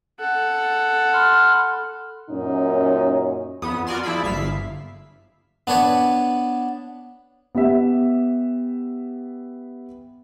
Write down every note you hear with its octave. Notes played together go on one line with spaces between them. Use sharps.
A4 F#5
B5 C6 F6
F#2 A#2 C#4 D#4
F2 B3 D#6
F4 F#4 A#4 D5 G#5 C6
F3 E4 G#4 D5 B5
G1 E5 F5 B6 C7
B3 D4 B4 C#5
B3 G4 E5